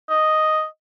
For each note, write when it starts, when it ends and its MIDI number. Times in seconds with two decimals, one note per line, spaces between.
0.09 0.65 75